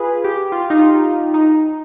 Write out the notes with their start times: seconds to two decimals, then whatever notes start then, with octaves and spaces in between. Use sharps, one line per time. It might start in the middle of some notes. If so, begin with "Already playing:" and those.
Already playing: F4 G#4 B4
0.24 G4
0.52 F4
0.70 D#4
0.79 F4
1.34 D#4